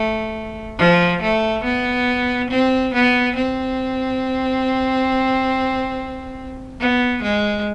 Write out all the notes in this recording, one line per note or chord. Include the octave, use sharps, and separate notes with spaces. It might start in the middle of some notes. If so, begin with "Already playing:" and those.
Already playing: A3
F3
A3
B3
C4
B3
C4
B3
G#3